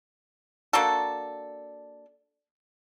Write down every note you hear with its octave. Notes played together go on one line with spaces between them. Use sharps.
A#3 D4 F#4 A4